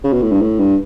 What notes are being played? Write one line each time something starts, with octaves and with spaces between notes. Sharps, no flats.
C#3
B2
A2
G2
A2
G2